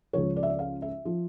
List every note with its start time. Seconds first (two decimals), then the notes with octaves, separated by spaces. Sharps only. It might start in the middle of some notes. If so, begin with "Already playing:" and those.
0.13 C#2 C#3 F3 C#5
0.36 D5
0.43 E5
0.50 D5
0.59 F5
0.82 E5
1.05 F3